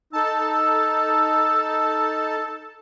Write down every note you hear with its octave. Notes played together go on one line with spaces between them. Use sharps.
D#4 A4 A5 E6